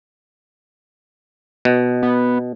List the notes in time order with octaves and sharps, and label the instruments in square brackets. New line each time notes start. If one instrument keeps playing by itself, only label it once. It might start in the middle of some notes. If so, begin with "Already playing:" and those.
[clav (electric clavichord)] B2
[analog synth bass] B3